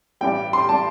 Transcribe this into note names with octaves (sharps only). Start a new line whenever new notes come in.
A1 G2 G3 G5
C6
G3 A5